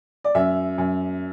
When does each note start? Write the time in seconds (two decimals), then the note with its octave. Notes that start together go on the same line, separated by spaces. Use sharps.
0.24 D5
0.35 F#2 E5
0.78 F#2